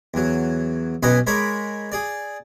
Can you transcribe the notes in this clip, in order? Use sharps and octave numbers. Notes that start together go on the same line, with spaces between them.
E2 F#3
B1 B2 C#4 B4 D#5 G#5
G#3 A#4 C#5 B5 D6
G#4 D5